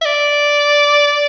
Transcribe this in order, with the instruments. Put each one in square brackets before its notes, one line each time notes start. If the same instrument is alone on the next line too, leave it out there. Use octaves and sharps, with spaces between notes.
[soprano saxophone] E5
D5